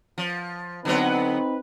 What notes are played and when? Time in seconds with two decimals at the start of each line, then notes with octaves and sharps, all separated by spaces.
0.18 F3
0.85 D3 F#3 B3 C4 D#4 B4